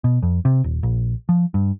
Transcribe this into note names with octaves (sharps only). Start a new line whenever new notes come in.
B2
F2
C3
D#1
A#1
F3
G2